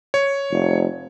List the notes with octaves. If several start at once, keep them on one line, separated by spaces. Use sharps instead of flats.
C#5
F1